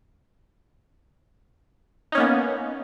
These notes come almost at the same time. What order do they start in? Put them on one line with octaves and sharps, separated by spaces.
D#4 C#4 A#3 B3